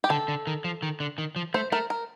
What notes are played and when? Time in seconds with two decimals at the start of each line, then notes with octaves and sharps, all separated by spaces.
0.04 G4
0.10 D3 A4
0.28 D3
0.47 D#3
0.64 F3
0.82 D#3
1.00 D3
1.18 D#3
1.36 F3
1.54 A3 C5
1.72 A3 A#4
1.90 A#4